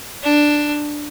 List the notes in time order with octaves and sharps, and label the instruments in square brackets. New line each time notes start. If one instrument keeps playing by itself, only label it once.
[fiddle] D4